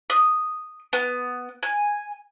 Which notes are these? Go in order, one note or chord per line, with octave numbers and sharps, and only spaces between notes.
D#6
B3
G#5